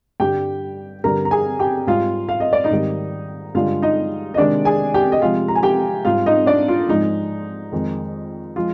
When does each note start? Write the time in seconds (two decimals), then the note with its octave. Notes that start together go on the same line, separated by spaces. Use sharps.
0.20 G2 D3 G3 G4 G5
1.04 G2 D3 G3 A#4 A#5
1.25 A#5
1.31 G#4 G#5
1.59 G4 G5
1.87 G#2 G3 F4 F5
2.29 F5
2.40 D#5
2.53 D5
2.64 D#4 D#5
2.70 G#2 D#3 G3
3.55 G2 D3 G#3 F4 F5
3.82 D#4 D#5
4.34 D#5
4.37 C3 D#3 G#3 D4 D5
4.65 G#4 G#5
4.94 G4 G5
5.12 D#5
5.21 C3 F3 G#3 F4 F5
5.48 A#5
5.55 G#5
5.63 G4 G5
6.05 G#2 G3 F4 F5
6.26 D#4 D#5
6.46 D4 D5
6.68 F4
6.89 G#2 F3 G#3 D#4
7.72 F2 D#3 G#3
8.56 F3 G#3 F4